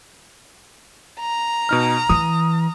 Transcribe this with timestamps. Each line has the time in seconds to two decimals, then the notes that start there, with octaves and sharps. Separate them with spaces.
1.20 A#5
1.69 B2 D#4 F6
2.09 E3 D#6